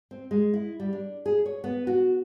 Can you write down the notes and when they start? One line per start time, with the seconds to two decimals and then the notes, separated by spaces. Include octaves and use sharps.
0.11 C4
0.31 G#3
0.54 E4
0.80 G3
0.93 D4
1.26 G#4
1.46 C#5
1.64 B3
1.87 F#4